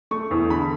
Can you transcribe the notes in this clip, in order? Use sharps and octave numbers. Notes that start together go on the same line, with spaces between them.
A3 C#6
E2
D3 B5